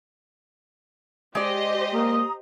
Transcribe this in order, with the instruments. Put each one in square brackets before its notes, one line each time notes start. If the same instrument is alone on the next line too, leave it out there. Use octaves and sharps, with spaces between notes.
[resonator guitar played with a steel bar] G#3 D5 [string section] G4 C5 D#5
[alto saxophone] A#3 [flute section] A#5 D#6